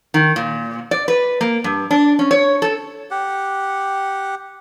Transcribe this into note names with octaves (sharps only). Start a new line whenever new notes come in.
D#3
A#2
D5
B4
A#3
G2
D4
C#4
C#5
A4
G4 F#5